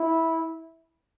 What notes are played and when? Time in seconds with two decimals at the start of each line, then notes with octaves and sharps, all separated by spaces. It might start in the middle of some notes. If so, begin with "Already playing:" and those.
Already playing: E4